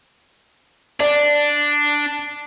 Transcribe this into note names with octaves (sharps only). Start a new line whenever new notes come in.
D4 D5